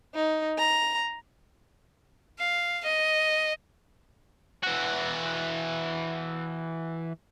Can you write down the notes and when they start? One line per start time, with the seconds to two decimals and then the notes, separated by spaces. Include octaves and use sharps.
0.15 D#4
0.58 A#5
2.39 F5
2.84 D#5
4.64 E3 F#4